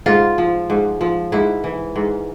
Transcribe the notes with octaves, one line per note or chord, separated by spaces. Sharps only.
G#2 F4
F3
G#2
F3
G#2 E4
E3
G#2